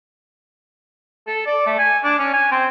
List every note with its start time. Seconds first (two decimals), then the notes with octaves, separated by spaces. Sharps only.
1.27 A4
1.47 D5
1.67 A3
1.79 G#5
2.04 D4
2.19 C#4
2.34 G#5
2.52 C4